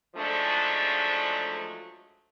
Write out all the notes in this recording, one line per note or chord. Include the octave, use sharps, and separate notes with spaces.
G#2 F3 F#3 G#3 A3 D4